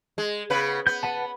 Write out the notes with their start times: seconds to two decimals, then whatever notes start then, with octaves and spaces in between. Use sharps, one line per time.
0.18 G#3
0.50 C#3 B3 B4
0.87 B3 G6
1.03 B4 F#5 A5